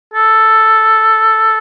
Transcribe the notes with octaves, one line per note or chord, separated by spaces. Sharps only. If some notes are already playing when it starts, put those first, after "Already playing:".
A4